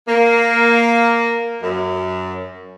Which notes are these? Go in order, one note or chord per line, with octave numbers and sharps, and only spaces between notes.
A#3
F#2